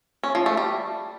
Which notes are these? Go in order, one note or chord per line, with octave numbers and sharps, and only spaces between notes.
C#4
F3
A3
G3